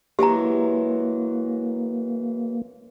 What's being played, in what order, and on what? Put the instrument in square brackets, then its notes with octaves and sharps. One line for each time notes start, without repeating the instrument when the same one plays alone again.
[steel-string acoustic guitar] E3 F#3 G#3 [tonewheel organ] A#3 [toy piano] G4 A#5